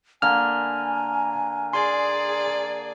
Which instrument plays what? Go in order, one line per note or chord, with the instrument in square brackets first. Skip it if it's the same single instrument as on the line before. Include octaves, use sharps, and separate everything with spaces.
[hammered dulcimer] D3 A#3 [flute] G#5 [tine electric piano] F6
[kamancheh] G#4 D5 [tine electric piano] C6